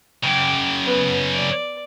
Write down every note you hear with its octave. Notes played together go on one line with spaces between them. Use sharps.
F#2 C#3 G5 D6
B3 B4
D5